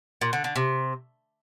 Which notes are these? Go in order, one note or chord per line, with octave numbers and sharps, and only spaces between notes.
A#2
D3
D3
C3